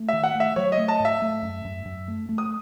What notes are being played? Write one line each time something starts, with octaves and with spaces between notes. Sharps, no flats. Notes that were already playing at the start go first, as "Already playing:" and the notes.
Already playing: A3
D#3 E5
F#5
A3
E5
F#3 C#5
D#5
A3
A5
G#2
E5
A3
F#2
F#2
F#2
A3
A3
D#6